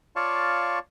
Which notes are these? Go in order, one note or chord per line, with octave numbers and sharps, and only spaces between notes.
F4 C#5 D5 F5 A5 C#6